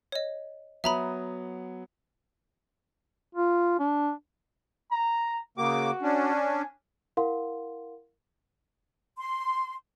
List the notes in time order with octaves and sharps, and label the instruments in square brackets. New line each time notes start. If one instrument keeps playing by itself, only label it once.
[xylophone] C#5 D#5
[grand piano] F#3 B3 D#6 [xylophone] E5 A#5 B5
[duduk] F4
D4
[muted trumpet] A#5
[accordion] C#3 A#3 D6 [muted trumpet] F#4
[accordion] C#4 D4
[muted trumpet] G#5
[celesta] E4 A#4 F5 F#5 C6
[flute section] C6